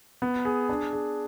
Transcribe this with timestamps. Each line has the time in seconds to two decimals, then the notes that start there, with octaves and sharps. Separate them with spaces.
0.22 B3
0.45 G#4
0.69 D4
0.93 G#4